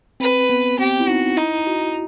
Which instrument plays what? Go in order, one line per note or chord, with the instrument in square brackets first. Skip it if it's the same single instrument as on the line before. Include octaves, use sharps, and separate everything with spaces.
[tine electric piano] C4 [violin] B4
[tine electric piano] B3
[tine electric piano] C4 [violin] G4
[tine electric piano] E4
[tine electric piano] D#4 [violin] F#4
[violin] D#4 [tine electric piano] E4
[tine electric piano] F#4